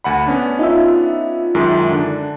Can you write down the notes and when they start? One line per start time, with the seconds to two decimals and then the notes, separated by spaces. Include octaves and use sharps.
0.04 D2 F#5 B5
0.26 B3 C#4 D4
0.59 D#4 F4 E5
1.55 F#2 D#3 G#3
1.90 D3 D4